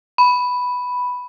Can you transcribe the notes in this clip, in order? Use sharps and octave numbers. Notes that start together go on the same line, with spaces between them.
B5